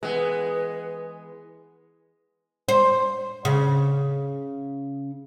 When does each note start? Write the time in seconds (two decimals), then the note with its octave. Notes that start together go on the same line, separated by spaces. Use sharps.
0.03 E3 G#3 B3 B4
2.68 C5
3.45 C#3